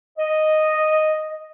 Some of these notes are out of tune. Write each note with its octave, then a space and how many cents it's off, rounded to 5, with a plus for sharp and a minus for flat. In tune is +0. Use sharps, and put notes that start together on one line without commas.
D#5 -5